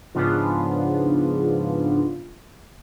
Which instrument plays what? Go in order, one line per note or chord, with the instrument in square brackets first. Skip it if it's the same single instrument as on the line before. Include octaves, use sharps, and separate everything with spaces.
[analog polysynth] G#2 C#3 F3 B3 D4 F4